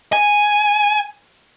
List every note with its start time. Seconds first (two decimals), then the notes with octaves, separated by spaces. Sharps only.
0.13 G#5